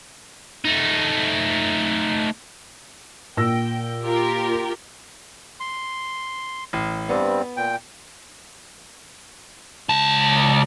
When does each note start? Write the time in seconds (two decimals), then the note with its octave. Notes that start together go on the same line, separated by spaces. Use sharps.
0.65 A3 D#4
3.37 A#2 G5 E6 A#6
4.03 F4 G4 A#4
5.60 C6
6.73 A1
7.09 G2 G3 B3 C4
7.57 A#2 G5
9.89 C#2 A5